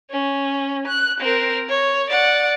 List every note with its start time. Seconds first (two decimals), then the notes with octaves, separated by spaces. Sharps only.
0.11 C#4
0.87 F#6
1.20 C4 A#4
1.69 C#5
2.10 D5 F#5